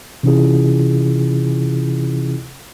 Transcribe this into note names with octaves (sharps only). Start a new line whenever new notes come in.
C3 E3 C#4 E4 F4 G#4